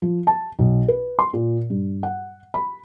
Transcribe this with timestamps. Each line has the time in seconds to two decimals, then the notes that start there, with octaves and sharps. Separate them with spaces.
0.02 F3
0.27 A5
0.59 B1
0.88 B4
1.19 C6
1.33 A#2
1.70 G2
2.03 F#5
2.54 B5